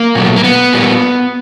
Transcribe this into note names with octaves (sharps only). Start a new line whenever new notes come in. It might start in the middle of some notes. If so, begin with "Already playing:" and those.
Already playing: A#3
B2 F#3 A3
A#3
B3
A#2 G3 A#3